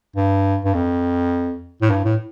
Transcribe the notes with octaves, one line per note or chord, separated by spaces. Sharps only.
G2
G2
F2
A2
G2
A2